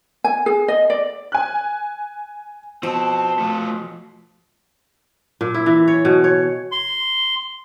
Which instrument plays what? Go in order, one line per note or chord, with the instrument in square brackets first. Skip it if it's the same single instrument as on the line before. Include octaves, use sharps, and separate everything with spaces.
[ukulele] G#5
G#4
D#5
D5
[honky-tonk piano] G#5 F#6
[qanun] B2 [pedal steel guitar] F3 [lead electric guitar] C4 C5 [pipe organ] A5
[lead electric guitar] A3 F4
[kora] A#2
E4
E3
C#5
B2
C#5
[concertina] C6